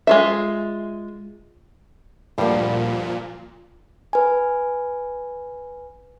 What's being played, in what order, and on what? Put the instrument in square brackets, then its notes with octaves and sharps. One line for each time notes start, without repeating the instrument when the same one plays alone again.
[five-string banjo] G#3 F4 E5
[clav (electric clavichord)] D2 G2 G3 [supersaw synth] A#2 [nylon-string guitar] F3 A#3
[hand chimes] B4 G#5